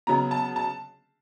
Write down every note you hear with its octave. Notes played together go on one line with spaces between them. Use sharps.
C#3 F#3 B3 A#5
A5
A5